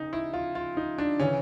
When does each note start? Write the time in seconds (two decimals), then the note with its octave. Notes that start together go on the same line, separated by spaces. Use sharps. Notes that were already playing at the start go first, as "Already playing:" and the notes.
Already playing: F1 C#3 D#4
0.13 E4
0.34 F4
0.55 F4
0.77 D#4
0.98 D4
1.20 C#3 E3 C#4